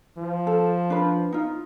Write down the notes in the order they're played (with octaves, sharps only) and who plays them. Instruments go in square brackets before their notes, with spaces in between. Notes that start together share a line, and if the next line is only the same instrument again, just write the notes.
[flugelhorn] F3
[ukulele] A4
D4 B4
D#4 F4